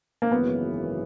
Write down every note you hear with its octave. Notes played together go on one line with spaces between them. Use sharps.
A#3
G#1 F#2 C#3 E3 B3